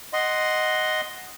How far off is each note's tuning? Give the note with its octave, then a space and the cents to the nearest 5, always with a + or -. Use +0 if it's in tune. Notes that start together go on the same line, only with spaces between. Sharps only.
D#5 +0 F#5 +0 C6 +0